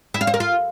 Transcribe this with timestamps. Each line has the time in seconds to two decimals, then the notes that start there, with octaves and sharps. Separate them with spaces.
0.14 E4
0.21 F5
0.27 C5
0.34 A#4
0.40 F4